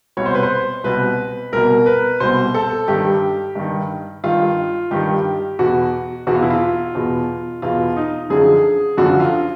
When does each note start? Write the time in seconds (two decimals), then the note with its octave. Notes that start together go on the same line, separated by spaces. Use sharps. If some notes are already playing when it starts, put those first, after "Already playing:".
0.17 C2 B2 C#5
0.26 C5
0.35 B4
0.43 C5
0.84 C2 B2 B4
1.53 C2 B2 A#4
1.86 B4
2.20 C2 B2 C5
2.54 A4
2.88 G2 D#3 G4
3.56 G2 D#3
4.24 G2 D#3 F4
4.91 G2 D#3 G4
5.59 E2 B2 F#4
6.27 E2 B2 F#4
6.35 F4
6.42 E4
6.50 F4
6.95 E2 B2
7.62 E2 B2 F4
7.96 D#4
8.30 F#2 D3 F3 G#4
8.98 F#2 D3 F3 F#4
9.20 F4